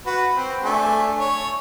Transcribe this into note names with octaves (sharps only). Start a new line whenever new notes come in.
F#4 B4
C4
A3 D4 G#5
C#5